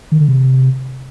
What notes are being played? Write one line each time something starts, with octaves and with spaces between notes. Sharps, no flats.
D#3
D3
C3